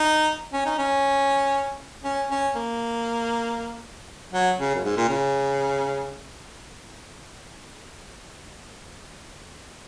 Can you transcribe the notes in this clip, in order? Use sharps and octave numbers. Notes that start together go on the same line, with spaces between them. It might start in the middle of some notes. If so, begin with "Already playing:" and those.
Already playing: D#4
C#4
D#4
C#4
C#4
C#4
A#3
F#3
C#3
F#2
G#2
A#2
C#3